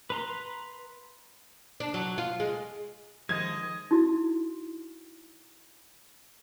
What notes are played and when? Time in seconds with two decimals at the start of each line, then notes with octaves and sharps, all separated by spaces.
0.10 B4 A#5 C6
1.80 D4
1.94 F#3
2.18 F4
2.40 G#3
3.29 D#3 F3 G#3 D#5 G#6
3.91 D#4 E4 F#4